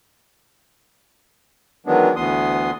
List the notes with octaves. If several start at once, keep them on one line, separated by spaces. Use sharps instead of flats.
D#3 E3 F#3 G#3 B3 D4
D2 E3 B3 C6 D#6